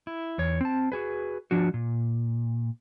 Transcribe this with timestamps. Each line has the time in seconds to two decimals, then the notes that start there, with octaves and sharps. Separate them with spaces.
0.07 E4
0.38 E2 C#5
0.61 C4 A5
0.92 F#4 G#4 B4
1.51 F3 D4 F#4
1.74 A#2